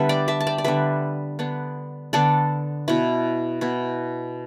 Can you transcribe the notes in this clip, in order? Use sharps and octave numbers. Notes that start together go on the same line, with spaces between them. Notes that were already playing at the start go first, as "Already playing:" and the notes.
Already playing: D3 G3 B3 A4 B4 E5
D5 G5
E5 A5
A5
D5 G5
D5
D3 G3 B3 B4 E5
D3 B3 D4
D3 B3 D4 A4 D5
B2 B3 E4
B2 B3 E4